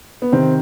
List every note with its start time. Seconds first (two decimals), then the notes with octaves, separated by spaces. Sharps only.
0.22 B3
0.32 C3 D#3 C4